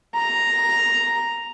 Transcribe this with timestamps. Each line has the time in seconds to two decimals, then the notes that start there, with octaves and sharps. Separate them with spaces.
0.15 A#5